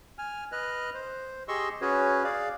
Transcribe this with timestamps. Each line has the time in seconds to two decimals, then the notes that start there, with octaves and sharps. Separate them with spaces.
0.18 G#5 F6
0.52 B4 D#5 F6 F#6
0.94 C5
1.48 G4 G#4 D#5 C6 C#6 E6
1.81 C#4 F#4 G#4 B4 C#5
2.24 G#4 D5 F5